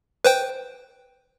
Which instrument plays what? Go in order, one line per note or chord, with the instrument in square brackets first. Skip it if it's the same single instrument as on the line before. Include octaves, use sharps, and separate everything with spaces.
[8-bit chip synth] B4 C5 G5